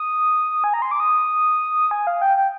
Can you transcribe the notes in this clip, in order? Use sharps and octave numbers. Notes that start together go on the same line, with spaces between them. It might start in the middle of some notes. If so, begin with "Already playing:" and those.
Already playing: D#6
G#5
A#5
C6
D6
D#6
G#5
F5
G5
G5